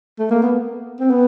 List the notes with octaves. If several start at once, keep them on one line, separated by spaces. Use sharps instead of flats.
A3
A#3
B3
C4
B3